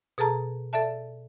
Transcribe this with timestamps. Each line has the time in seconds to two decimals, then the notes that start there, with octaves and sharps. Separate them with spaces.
0.18 B2 G#4 A4 A5 A#5
0.73 A4 D5 E5 A5